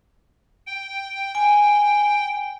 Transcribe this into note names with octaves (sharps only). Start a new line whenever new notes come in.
G5
G#5